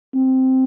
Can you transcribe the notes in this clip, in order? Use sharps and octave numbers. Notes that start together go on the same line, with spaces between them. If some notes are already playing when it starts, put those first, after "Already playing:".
C4